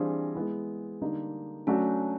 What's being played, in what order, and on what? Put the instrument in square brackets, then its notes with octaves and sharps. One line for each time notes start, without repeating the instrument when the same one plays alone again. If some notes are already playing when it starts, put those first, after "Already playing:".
Already playing: [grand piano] E3 G3 C4 F4 G#4 [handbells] D4
[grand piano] G#3 B3 E4
D3 G3 A#3 D#4
[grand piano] F#3 A3 D4 F#4 [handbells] C#4